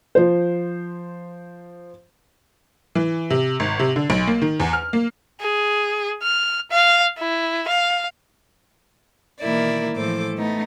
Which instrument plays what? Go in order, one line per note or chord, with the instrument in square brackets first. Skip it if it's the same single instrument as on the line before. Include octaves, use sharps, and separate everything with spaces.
[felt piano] F3 C5
[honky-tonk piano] E3
C3
G#1
C3
D3
B1
A#3
D#3
E2
F6
A#3
[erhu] G#4
F6
F5
E4
F5
[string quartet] B2 D#3 E3 A#3 E4 D5
A2 E3 F3 A4 C5 D6
A3 B3 D#4